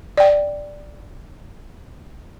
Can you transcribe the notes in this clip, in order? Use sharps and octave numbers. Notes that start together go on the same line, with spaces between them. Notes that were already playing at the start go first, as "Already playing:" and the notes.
D5 G5